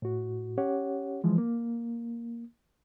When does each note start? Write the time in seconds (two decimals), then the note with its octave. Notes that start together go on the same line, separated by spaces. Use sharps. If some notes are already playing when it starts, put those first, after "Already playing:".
0.02 A2 F#4
0.58 C#4 G4 C#5 F#5
1.24 E3 F3 G#3
1.38 A#3